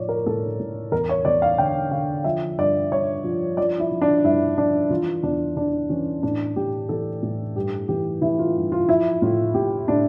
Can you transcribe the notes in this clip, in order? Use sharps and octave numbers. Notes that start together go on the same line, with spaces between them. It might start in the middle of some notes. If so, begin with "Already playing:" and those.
Already playing: A2 F3 C#5 D5
A#4
A2 A4
A2
E2 A#4
C#5
E2 D5
F5
D3 G5
D3 F5
F3 E5
G2 D5
G2 C#5
F3
F3 D5
E4
F3
D4
G2 E4
F3 D4
E3 F4
E2 D4
E3 D4
E3 C#4
A2 D4
A2 G4
E3 A4
A2
G2 G4
E3 G4
E3 E4
F4
G2
F4
F3 E4
A2 F4
A2 G4
A2 D4